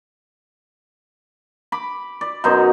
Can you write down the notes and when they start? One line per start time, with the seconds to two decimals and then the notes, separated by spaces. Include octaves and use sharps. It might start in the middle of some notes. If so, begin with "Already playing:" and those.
1.72 B5 D6
2.21 D5
2.44 F#2 B2 D#4 C5